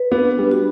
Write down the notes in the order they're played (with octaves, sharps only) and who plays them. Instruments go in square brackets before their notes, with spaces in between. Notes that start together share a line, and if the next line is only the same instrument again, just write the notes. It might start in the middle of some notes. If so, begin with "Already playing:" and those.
Already playing: [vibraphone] B4
[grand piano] B3 [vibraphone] D4
[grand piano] G3
[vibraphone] F#4